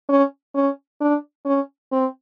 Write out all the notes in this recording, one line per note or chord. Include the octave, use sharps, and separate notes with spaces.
C#4
C#4
D4
C#4
C4